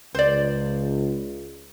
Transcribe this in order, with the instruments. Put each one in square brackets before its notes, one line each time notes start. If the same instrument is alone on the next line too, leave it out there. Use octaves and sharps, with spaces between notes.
[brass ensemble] C#2 [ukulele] C5 D5